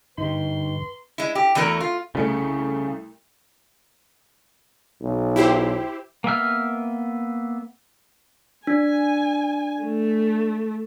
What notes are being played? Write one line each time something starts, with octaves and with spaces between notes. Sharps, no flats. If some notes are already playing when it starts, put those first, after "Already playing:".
G2 D3 D#4 G4 B4 C6
G#3 E4
G4
E2 E3 A3 F#4 A#4
F4
C2 C#3 A3 C#7
B1
E4 G4 C5
A#3 B3 E5 F6
D4 G#5
A3